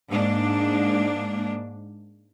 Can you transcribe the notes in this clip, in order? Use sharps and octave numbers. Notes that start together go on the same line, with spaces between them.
G#2 A#3 D4